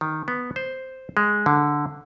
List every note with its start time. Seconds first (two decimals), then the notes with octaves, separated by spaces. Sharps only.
0.01 D#3
0.28 B3
0.56 C5
1.17 G#3
1.46 D3